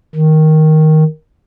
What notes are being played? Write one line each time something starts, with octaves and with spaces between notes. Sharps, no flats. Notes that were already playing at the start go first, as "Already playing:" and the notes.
D#3